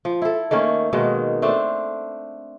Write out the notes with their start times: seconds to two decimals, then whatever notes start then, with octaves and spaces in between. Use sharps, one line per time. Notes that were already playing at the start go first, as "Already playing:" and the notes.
0.05 F3
0.22 E4 A4
0.51 D#3 A3 A#3 C#4
0.93 B2 D#3 G#3 A#3
1.42 A3 C4 D4